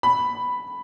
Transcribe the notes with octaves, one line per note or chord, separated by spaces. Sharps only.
B5